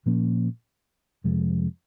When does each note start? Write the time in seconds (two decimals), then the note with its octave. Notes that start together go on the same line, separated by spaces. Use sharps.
0.06 A#2 F3 A#3 C#4
1.24 F2 C3 F3 G#3